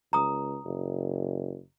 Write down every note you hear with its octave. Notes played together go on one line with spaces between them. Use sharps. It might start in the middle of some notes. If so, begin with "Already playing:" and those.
C#2 A#5 D#6
F#1